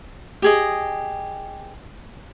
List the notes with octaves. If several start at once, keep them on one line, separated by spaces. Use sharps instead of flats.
G4 G#4 D#5